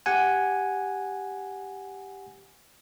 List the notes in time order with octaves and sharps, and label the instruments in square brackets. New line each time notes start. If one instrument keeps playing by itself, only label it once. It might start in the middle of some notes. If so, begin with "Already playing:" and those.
[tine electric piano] G4 F#5 G#5